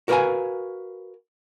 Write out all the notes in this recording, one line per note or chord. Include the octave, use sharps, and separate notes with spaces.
F#4 A#4 B4 D5 F5 G#5